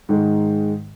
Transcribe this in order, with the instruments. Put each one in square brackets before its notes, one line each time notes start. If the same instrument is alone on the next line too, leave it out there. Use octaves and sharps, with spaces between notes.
[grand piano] G#2 D#3 G#3